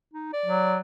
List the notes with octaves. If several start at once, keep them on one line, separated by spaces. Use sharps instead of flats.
D#4
D5
F#3